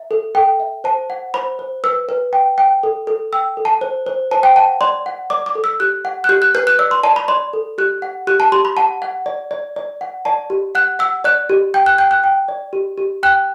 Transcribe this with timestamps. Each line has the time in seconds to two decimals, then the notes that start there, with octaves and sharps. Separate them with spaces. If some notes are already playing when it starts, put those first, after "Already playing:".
Already playing: E5
0.11 A4
0.35 A4 G5
0.60 E5
0.84 C5 A5
1.10 F#5
1.34 C5 B5
1.59 C5
1.84 B4 E6
2.09 B4
2.33 G5
2.58 G5
2.83 A4
3.07 A4
3.33 G5 E6
3.57 A4
3.65 A5
3.81 C5
4.06 C5
4.31 C5 A5
4.43 G5
4.56 F#5 A5
4.81 D5 C6
5.06 F#5
5.30 D5 D6
5.46 D6
5.55 A4
5.64 E6
5.80 G4 F#6
6.05 F#5
6.24 F#6
6.29 G4 G6
6.42 F#6
6.55 B4 G6
6.67 F#6
6.79 D5 E6
6.91 C6
7.03 D5 A5
7.16 B5
7.28 D5 C6
7.53 A4
7.78 G4 F#6
8.02 F#5
8.27 G4 F#6
8.40 A5
8.52 G4 C6
8.65 B5
8.77 F#5 A5
9.02 F#5
9.26 D5
9.51 D5
9.76 D5
10.01 F#5
10.25 D5 A5
10.50 G4
10.75 F#5 F#6
10.99 F#5 E6
11.24 D5 F#6
11.50 G4
11.74 G5 G6
11.86 F#6
11.98 G5 G6
12.11 F#6
12.24 G5
12.48 D5
12.73 G4
12.98 G4
13.23 G5 F#6